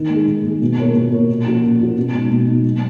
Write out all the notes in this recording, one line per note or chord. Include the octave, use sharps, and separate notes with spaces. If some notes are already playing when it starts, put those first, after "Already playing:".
Already playing: D#3
G#3 D#4 G#4
D#3
G#3 D#4 G#4
B2
A#3 F4 A#4 C#5
B2
A#3 F4 A#4 C#5
A#2
F3 A#3 C#4 F#4
A#2
F3 A#3 C#4 F#4
B2
G#3 D#4
B2
G#3 D#4
F#3